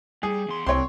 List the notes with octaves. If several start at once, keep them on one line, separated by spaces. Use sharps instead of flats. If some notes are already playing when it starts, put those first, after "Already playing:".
G3 G#4
E2 C6
C2 C4 C#5 C6